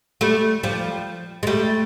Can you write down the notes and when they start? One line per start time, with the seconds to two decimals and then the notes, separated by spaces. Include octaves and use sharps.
0.21 G3 A3
0.63 F3 G3
1.43 G#3
1.47 G3 A3